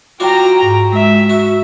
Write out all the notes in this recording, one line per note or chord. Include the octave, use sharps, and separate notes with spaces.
F#3 F4 F#4 G5 A#5 D6
G#2
G#3 E5
F#4